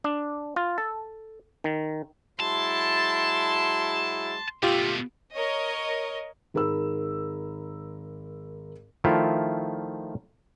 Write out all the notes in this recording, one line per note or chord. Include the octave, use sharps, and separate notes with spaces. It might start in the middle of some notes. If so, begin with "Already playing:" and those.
D4
F4
A4
D#3
F#3 G#3 E4 A5 C6
B2 A3 F4 G4
A#4 C#5 D#5
G#1 G#4 A#4 B5 E6
D#3 F3 A3 E4 F4